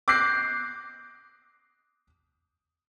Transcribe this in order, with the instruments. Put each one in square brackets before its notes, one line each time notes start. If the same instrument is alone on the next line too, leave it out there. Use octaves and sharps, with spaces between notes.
[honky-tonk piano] D6 F#6 G6 A#6 C7